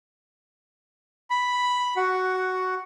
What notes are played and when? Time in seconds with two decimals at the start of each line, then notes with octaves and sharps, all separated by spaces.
1.30 B5
1.96 F#4 F#5